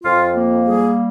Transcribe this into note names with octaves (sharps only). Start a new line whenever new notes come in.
F2 F4
A#3
G3 G#4